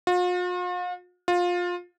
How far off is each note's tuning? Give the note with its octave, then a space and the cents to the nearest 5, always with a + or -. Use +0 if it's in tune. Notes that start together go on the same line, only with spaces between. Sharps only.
F4 +45
F4 +20